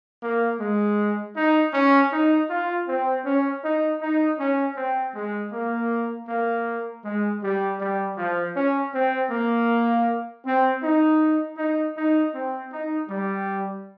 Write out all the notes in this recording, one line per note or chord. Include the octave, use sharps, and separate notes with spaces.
A#3
G#3
D#4
C#4
D#4
F4
C4
C#4
D#4
D#4
C#4
C4
G#3
A#3
A#3
G#3
G3
G3
F3
C#4
C4
A#3
C4
D#4
D#4
D#4
C4
D#4
G3